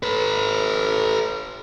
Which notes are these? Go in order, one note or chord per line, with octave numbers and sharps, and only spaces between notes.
A4 B4